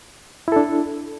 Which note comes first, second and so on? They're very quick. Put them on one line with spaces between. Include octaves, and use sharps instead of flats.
E4 A4 D4